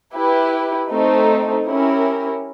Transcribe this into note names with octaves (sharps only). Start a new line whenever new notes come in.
E4 G4 B4
A3 C4 D#4
C#4 E4 G4 A#4